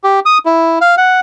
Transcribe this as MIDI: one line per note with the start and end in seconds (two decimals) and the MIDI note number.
0.04 0.20 67
0.25 0.38 87
0.46 0.79 64
0.81 0.95 77
0.98 1.20 78